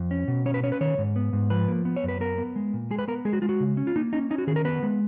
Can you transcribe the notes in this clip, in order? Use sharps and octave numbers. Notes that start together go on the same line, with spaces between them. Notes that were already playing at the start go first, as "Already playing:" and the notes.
Already playing: F2
C#4
B2
C#4 C#5
B4
C#4 C#5
B4
D#3 C#5
G#2
B3
G#2
F3 B4
A#3
B3
C#5
F#2
B4
B3 A#4
B3
G#3
A#2
G#3 G#4
B4
B3 A#4
G#3 G#4
F#4
G#3 F4
F#4
C#3
C#4
F4
A#3 D#4
C#4 D#4
C#4 D#4
F#4
D#3 G#4
A#4
B3 B4
G#3